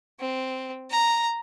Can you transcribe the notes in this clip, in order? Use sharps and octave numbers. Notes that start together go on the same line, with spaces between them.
C4
A#5